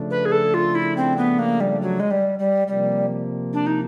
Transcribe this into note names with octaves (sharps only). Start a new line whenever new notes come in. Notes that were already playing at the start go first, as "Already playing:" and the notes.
Already playing: C#3 F3 A3 D4
B4
G#4
A4
F4
E4
C4
B3
A#3
G3
F#3
G#3
G3
G3
C3 F3 G3 A#3
D4
D#4